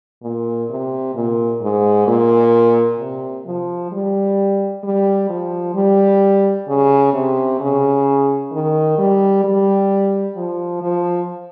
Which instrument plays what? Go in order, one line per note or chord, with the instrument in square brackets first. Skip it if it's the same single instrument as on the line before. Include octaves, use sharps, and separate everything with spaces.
[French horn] A#2
C3
A#2
G#2
A#2
C3
F3
G3
G3
F3
G3
C#3
C3
C#3
D#3
G3
G3
F3
F3